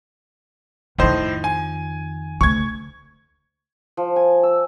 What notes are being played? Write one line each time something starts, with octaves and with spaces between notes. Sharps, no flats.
F2 A2 D#3 D#4 C5
G#5
D2 C#6 G#6
F3
G#5
E6